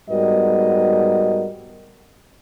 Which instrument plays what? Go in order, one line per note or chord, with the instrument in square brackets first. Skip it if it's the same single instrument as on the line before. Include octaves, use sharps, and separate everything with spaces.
[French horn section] G#2 G3 B3 F#4 A#4 D#5